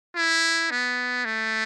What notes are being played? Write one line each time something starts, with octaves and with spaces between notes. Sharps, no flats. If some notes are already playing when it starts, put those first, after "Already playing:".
E4
B3
A3